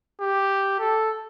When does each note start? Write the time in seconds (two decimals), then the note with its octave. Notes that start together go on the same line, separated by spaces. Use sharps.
0.21 G4
0.80 A4